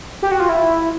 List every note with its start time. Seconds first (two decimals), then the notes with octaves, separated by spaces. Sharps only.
0.22 G4
0.31 F#4
0.40 F4
0.49 E4